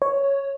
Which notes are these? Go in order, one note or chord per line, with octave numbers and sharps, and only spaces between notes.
C#5